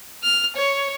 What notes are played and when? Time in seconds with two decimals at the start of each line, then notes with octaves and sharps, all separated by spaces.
0.23 F6
0.56 C#5